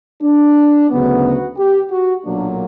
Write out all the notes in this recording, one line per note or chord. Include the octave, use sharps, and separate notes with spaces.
D4
D2 C#3 F#3 B3
F#4
G4
F#4
B1 A#2 F#3 A#3 D4